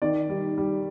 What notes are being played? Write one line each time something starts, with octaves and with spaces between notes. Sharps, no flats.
D#3 D5
G3
G3